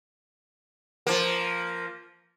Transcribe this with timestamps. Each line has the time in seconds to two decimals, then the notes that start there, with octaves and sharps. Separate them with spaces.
1.07 F3 A#3